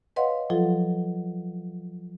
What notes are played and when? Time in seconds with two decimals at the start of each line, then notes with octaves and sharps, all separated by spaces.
0.16 B4 C#5 D#5 F5 F#5 C6
0.50 F3 F#3 F4 A4